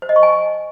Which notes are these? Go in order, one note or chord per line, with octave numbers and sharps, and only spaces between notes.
C5
D#5
C#6
G#5